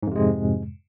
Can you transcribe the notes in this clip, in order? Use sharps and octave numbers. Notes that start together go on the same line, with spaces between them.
F2 G#2 C3 G#3